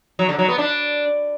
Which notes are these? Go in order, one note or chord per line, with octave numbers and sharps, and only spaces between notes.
F#3
D3
F#3
B3
D4